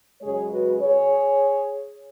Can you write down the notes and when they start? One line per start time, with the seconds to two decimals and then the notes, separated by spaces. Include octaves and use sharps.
0.21 F#2 C#3 G#3 G#4 C#5
0.51 F#4 B4
0.81 G#4 C#5